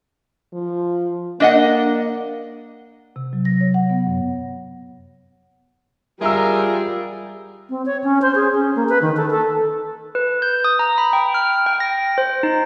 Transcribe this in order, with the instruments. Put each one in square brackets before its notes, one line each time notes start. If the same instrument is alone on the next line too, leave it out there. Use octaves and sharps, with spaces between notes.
[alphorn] F3
[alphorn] A#3 [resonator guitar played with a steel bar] D4 D#5 F#5
[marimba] C3
F#3
A#6
C#5
F#5
B3
F#2
[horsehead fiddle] G3 [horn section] F4 G#4 A#4 [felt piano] E5 A#5 E6
[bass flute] C4
C#5
C#4
C5
G#4
C#4
A#3
B4
D#3
A4
A4
[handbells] B4
G6
D#6
A#5
B5
G5
F6
G5
A#6
C5
D#4